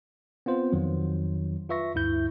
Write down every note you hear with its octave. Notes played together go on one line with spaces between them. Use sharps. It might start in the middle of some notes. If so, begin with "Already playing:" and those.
B3 C4 F4 C5
F2 D#3 F#3
F4 B4 E5 C#6 A#6
D2 G2 E4 G6